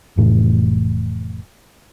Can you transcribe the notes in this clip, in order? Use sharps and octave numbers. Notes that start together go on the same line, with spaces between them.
F1 A2 E3